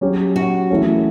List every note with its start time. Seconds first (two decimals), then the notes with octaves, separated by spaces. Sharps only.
0.01 F#3 C#4 G4
0.36 F#4
0.70 E3 A3 C#4